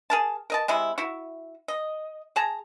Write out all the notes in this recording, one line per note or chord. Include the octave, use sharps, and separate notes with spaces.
G#4 A#4 A5
A#4 D#5 A5
C3 G#3 E4
E4 F#4
D#5
G#4 A5 A#5